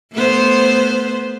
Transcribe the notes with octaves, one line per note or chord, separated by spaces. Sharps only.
A3 B3 C5